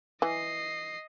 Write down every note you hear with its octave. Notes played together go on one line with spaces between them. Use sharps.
E3 D#5 C7